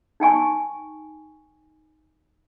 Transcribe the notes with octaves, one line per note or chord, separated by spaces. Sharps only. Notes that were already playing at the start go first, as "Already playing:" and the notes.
D#4 G5 G#5 C#6